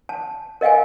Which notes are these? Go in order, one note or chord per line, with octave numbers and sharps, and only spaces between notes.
A5
A#4 D#5 F5 G5 G#5